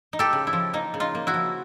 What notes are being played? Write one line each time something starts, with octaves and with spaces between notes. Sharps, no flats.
D#4
G4 A4
C#3
E4
F3
A#3 D#4
C#3
D#4 F4
A#3
E4 F#4
F3